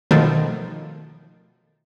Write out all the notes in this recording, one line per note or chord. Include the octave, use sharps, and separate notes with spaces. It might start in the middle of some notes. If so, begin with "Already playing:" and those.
B2 D#3 F3 A3